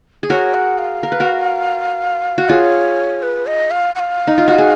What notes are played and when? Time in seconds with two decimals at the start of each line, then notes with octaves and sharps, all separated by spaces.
0.23 G#4
0.30 F#4 A#4 C#5
0.54 F#5
0.78 F5
1.03 A#4
1.12 B4
1.20 F#4 A#4
2.38 F#4
2.49 F4 G#4 C#5
3.23 B4
3.47 D#5
3.71 F5
3.95 F#5
3.99 F5
4.27 D#4
4.38 F4
4.48 F#4
4.58 G#4